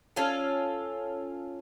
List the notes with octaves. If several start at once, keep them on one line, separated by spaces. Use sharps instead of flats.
C#4 F4 A4